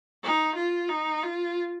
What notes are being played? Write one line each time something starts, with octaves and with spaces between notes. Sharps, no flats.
D#4
F4
D#4
F4